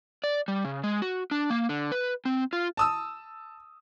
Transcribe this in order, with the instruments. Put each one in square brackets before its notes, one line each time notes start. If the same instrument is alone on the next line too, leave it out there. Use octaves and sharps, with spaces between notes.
[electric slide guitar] D5
G3
C#3
G#3
F#4
D4
A#3
D3
B4
C4
F4
[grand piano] A5 D#6 E6